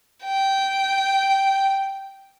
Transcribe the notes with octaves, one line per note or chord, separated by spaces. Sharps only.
G5